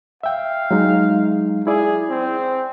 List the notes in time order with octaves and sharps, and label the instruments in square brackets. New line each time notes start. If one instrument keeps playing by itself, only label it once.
[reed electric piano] E5 G5 [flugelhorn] F5
[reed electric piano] F#3 G#3 D#4
[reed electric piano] E4 D5 [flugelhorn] G#4
[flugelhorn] C4